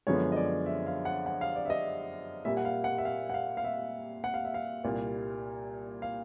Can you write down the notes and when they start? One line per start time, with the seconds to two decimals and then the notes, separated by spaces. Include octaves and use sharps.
0.07 F#2 D3 F3 G#3 B3 C#5
0.32 D#5
0.36 D5
0.66 E5
0.87 F5
1.05 F#5
1.26 F#5
1.41 F5
1.56 D5
1.65 E5
1.70 D#5
2.45 A#2 G3 A#3 E5
2.57 F#5
2.65 F5
2.84 F#5
2.98 E5
3.05 F5
3.30 F#5
3.34 F5
3.57 F5
3.64 E5
4.24 F#5
4.34 F5
4.45 E5
4.54 F5
4.84 C2 A#2 G3 A#3
6.02 F5